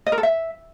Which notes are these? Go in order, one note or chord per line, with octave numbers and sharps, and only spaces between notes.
D#5
A#4
A4
E5